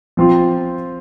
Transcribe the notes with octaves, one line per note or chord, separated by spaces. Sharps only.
F3 C4 F4